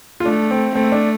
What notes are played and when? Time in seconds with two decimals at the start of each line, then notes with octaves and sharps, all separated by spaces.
0.20 F4
0.25 A3 D4
0.51 C4
0.75 A3 C4
0.92 D4